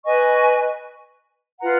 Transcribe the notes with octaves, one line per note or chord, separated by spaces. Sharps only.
B4 D#5 G#5 C#6
F4 B4 F#5 A#5